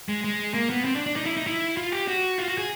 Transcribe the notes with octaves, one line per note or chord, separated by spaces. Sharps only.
G#3
G#3
A#3
B3
C4
D4
D4
D#4
E4
D#4
E4
F4
G4
F#4
F4
F#4
G#4